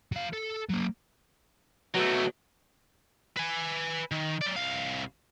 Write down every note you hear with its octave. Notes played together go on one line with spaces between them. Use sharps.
F#3 F5
A4
F#3 A#3
B2 F#3 A3
B4 G#5
D#3
F#3 D5
C2 F5